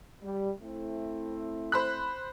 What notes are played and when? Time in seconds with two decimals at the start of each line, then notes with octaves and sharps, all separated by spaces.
0.23 G3
0.61 A3 C4 E4
1.72 C5 B5 F#6